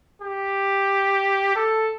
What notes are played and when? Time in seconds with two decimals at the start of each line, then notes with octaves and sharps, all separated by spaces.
0.22 G4
1.55 A4